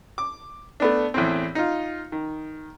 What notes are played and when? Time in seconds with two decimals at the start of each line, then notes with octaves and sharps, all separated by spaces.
0.18 D6
0.80 A3 B3 D4
1.14 E2 A2 C4
1.55 D#4 F4
2.12 D#3